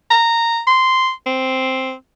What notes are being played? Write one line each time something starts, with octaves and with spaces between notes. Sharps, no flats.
A#5
C6
C4